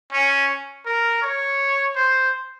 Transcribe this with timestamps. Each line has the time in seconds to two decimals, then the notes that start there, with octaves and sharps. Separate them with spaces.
0.13 C#4
0.86 A#4
1.22 C#5
1.96 C5